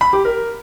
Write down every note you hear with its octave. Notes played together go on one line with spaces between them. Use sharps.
B5
G4
A#4